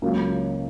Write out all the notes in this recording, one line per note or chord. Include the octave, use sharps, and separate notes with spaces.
C#2 C#3 F#3 A#3